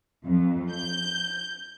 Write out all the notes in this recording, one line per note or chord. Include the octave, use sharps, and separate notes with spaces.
F2
G6